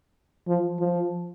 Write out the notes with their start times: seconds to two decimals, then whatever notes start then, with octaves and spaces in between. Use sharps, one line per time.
0.48 F3
0.80 F3